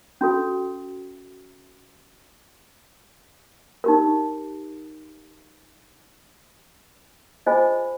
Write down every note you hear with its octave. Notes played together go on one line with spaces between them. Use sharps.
C#4 F#4 A4
D#4 G4 A#4
F4 G#4 C5 D#5 G#5